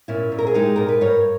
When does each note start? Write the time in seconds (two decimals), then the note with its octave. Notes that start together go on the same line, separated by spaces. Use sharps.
0.08 A#2 C#4 E4
0.32 A#2
0.39 A#4
0.47 G#4
0.54 G#3 D#4 G4
0.76 A#2 A#4
0.89 B4
1.01 G2 A#4 C#5